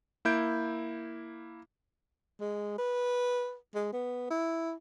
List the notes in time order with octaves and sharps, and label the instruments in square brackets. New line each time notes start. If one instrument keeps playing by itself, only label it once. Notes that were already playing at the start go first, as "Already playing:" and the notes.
[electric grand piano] A#3 E4 G6 D7
[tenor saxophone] G#3
B4
G#3
B3
E4